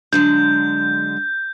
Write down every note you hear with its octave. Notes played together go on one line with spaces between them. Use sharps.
D3 F#3 G#3 G6